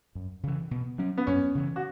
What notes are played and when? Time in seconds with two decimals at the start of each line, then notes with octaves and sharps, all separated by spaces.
0.15 F#2
0.43 C#3 E3
0.71 B2
0.98 F#3 C#4
1.18 B3
1.27 F#2 C#4
1.55 C#3 E3
1.76 F#4